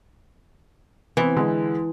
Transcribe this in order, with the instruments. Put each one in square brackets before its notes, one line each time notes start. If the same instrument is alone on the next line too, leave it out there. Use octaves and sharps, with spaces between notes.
[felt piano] C3 B3 C4 [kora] E3
[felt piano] D3 G#3